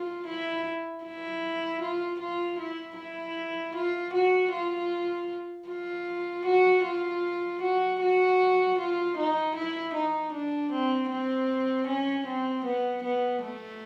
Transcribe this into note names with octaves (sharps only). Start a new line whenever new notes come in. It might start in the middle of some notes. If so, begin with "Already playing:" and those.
Already playing: F4
E4
E4
F4
F4
E4
E4
F4
F#4
F4
F4
F#4
F4
F#4
F#4
F4
D#4
E4
D#4
D4
C4
C4
C#4
C4
B3
B3
A3